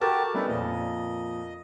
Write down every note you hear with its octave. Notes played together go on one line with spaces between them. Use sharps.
F#4 G4 A4 A#4 A5
G3 B3 C#4 D#4 E4 E5
F2 A#2 D#5